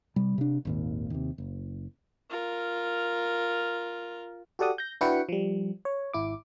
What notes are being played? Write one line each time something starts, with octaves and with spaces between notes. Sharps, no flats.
C3 G3
C3 D4
G#1 D#2 A#2
D#2 C3
F#1
F4 A#4
F#4 G4 A4 D5 F#5 D#6
G6 A#6
D4 E4 F#4 B4 G5 C#7
F3 G3
C#5
G#1 E4 D6